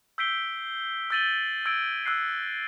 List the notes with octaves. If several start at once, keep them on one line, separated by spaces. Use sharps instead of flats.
E6 G6 B6 C7 D7 G7
E6 G6 A6 D#7 F#7 G7
E6 G#6 A#6 D7
E6 F#6 C7